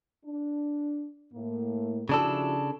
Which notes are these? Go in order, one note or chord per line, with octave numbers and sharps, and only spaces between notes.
D4
A2 A#3
C#3 F3 D4 E4 F#4 A4